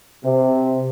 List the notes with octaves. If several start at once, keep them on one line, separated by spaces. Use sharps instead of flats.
C3